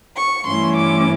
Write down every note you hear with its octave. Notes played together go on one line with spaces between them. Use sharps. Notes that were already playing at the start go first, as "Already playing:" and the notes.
C#6
G2 E3 A3 C#4 E4 C6
D6